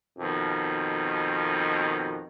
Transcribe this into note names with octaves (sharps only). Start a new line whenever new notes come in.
F2 B2 D#3